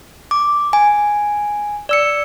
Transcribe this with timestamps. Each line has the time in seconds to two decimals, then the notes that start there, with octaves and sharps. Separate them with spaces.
0.31 D6
0.73 G#5
1.89 D5 E6 C#7